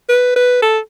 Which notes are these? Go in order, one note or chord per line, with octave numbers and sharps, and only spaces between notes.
B4
B4
A4